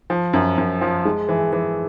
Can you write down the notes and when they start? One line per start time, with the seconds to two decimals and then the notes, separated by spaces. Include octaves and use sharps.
0.10 F3
0.33 F#2
0.58 F#2
0.81 F3
1.05 G#3
1.29 E3
1.53 E3